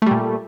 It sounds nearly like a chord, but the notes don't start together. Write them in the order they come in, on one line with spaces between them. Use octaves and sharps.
A3 G3 A#2